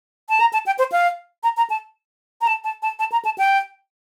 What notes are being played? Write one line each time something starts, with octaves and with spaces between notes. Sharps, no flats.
A5
A#5
A5
G5
C5
F5
A#5
A#5
A5
A#5
A5
A5
A5
A5
A#5
A5
G5